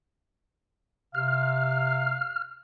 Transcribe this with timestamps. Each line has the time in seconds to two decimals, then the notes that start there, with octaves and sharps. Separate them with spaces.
1.15 C3 F5 F6